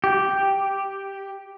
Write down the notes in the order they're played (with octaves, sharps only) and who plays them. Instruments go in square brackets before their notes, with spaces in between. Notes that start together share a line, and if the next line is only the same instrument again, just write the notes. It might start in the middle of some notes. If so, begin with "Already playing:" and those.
[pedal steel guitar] G4